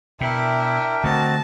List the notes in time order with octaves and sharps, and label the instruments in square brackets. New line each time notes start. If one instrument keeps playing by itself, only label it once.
[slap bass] B2 [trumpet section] D4 A#4 [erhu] E4 [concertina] E5 G5
[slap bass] D3 A3 [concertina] C4 F#4 D#5 [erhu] A5